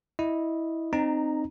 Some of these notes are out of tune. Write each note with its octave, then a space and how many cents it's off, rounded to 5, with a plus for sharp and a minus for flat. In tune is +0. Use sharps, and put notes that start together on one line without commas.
E4 -15 D#5 -10
C4 +5 D#4 -20 A#5 +0